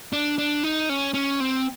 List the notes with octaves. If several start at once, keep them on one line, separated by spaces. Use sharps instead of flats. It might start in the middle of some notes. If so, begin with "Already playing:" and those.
D4
D4
D#4
C#4
C#4
C4